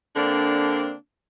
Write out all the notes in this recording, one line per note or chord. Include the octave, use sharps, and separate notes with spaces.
D3 A#3 C4 D4